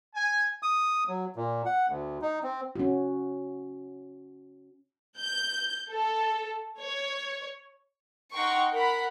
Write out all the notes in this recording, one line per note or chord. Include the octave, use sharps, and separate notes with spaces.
G#5
D#6
F#3
A#2
F#5
D2
D#4
C4
C#4 F#4
G6
A4
C#5
D#4 F#5 G5 A#5 C6 C#6
A#4 F#5 B5